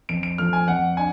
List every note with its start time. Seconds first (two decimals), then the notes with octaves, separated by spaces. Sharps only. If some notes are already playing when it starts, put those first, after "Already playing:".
0.09 F2 D7
0.23 D7
0.38 F3 A3 F6
0.53 G#5
0.68 F2 F#5
0.97 D4 G#5